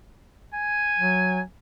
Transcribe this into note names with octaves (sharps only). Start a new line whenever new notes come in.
G#5
F#3